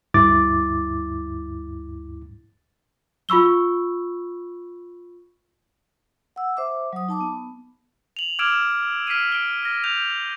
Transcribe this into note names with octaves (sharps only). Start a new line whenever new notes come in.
D2 G2 E4 D6 A6
F4 B5 C#6 E6 G7
F#5 E6
C5 E5 D6
F#3 D#6
D#4 A5 D6
B3
F7 F#7
D6 E6 F6 G#6 D7 E7
F6 B6 C7 D7 D#7
D7 G7
F6 A#6
G6 F7